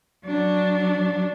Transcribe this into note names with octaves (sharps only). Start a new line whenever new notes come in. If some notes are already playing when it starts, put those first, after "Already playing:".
F#3 D4